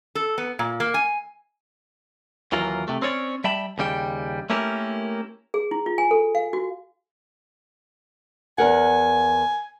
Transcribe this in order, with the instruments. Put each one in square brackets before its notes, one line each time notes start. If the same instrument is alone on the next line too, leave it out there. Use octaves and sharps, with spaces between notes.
[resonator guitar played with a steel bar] A4
B3
A#2
A#3
G#5
[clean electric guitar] D#2 E3 F#3 F4 A#4
C3 A3
C4 C#4 C#5 D5
G3 E5 G5 A5 B5
D#2 C#3 G3 G5
A3 A#3 C#4 E4 G4 A#4
[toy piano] G#4
E4
F4
G#5
A4
F5
F#4
[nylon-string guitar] E2 A#4 F#5 [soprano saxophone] G#5